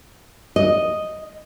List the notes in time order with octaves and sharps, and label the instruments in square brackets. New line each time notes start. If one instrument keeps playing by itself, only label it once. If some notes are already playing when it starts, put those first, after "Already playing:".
[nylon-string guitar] D#5